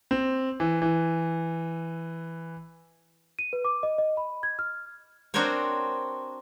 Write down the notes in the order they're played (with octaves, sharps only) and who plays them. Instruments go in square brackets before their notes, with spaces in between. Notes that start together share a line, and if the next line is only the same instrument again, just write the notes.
[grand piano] C4
E3
E3
[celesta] D#7
B4
D6
D#5
D#5
B5
G#6
F6
[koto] C4 D4 F#4 A#4 C5 C#5